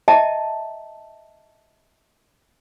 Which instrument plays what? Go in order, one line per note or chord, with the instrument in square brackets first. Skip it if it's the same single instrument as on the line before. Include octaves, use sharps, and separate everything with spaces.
[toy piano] D#5 E5 G5 A5 A#5